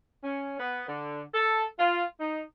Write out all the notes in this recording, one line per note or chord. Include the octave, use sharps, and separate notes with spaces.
C#4
B3
D3
A4
F4
D#4